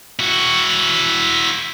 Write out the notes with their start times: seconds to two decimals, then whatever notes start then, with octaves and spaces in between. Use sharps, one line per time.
0.19 E4 F#4